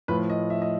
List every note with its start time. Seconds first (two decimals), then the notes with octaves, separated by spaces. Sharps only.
0.08 A2 F3 B4
0.30 D#5
0.50 E5
0.62 D#5